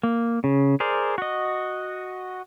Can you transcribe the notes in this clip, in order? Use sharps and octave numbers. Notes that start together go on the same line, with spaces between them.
A#3
C#3
G#4 A#4 C5 D5
F#4 D#5